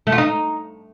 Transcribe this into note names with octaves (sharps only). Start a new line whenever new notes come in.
A3
F4
D#4